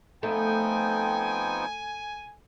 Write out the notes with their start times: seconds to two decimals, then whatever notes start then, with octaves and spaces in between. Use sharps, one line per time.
0.23 F3 A3 B3 C4 D#4 G5 G#5